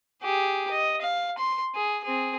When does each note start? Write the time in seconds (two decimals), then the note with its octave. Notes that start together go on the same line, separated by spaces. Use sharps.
0.23 G4 G#4
0.71 D#5
1.02 F5
1.38 C6
1.74 G#4
2.04 C4 G#4